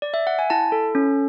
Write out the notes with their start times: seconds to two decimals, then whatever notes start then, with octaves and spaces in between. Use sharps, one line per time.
0.02 D5
0.14 E5
0.27 F#5
0.39 G#5
0.50 E4 A5
0.72 A4
0.95 C#4